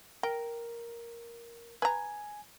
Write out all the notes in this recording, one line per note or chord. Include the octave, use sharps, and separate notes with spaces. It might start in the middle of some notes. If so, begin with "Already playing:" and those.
A#4 G5
B4 G#5 A#5